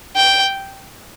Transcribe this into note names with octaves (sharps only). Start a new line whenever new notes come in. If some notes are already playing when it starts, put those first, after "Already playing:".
G5